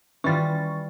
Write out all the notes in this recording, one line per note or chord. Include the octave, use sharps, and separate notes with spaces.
D#3 E3 G3 C#4 F4 B5 C#6 A6